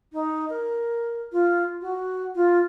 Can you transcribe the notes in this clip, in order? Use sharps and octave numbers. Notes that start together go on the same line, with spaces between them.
D#4
A#4
F4
F#4
F4